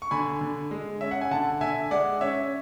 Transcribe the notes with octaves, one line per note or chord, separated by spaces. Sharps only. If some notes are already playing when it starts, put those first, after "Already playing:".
C#6
D3 G#5 B5
D3
G#3
C#4 E5
F#5
G#5
D3 F#5 A5
D3 E5 G#5
G#3 D5 F#5
C#4 C#5 E5